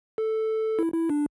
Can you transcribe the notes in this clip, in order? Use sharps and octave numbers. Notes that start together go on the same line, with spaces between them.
A4
E4
E4
D4